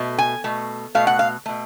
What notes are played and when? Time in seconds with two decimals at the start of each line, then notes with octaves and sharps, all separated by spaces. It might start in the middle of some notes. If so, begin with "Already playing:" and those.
Already playing: B2 A3
0.18 G#5
0.44 B2 A3
0.95 B2 A3 F5
1.07 F#5
1.19 F5
1.46 B2 A3